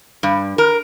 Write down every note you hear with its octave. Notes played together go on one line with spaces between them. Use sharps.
G2
A#4